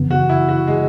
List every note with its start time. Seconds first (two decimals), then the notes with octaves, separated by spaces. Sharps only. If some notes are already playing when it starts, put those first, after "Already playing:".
Already playing: F#2 C#3 E3 B3
0.11 F#4
0.29 E4
0.49 F#4
0.67 G#3